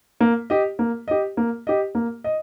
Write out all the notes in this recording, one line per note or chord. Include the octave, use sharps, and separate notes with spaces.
A#3
G4 D#5
A#3
G4 D#5
A#3
G4 D#5
A#3
D#5